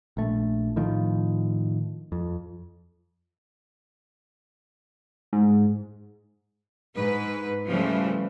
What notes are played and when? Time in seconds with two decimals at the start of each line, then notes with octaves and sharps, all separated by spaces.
0.17 A#1 A3
0.76 A2 D#3 F3
2.12 F2
5.33 G#2
6.97 G#2 B4
7.68 C#3 E3 F3 G3 A3